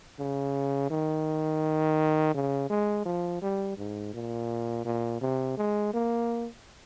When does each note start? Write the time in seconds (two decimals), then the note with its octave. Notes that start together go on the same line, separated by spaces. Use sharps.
0.19 C#3
0.91 D#3
2.34 C#3
2.70 G#3
3.06 F3
3.42 G3
3.78 G#2
4.14 A#2
4.86 A#2
5.21 C3
5.57 G#3
5.94 A#3